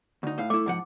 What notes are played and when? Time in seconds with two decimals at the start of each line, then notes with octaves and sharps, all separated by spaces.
0.23 D2 D#4
0.38 A2 F5
0.50 A3 E4 D6
0.66 G#2 F3 F#5